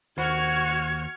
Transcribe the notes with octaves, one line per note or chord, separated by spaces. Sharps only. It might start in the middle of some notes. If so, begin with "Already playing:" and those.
D#2 F#4 C5 B5 C#6 F6 G#6